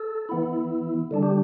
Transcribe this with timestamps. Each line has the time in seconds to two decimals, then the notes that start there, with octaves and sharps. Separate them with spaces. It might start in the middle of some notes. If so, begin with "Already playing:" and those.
Already playing: A4
0.29 E3 B3 E4
1.11 D3 G3 D4
1.23 G4